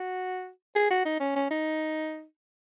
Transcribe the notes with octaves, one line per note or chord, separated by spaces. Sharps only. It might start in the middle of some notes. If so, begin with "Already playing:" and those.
Already playing: F#4
G#4
F#4
D#4
C#4
C#4
D#4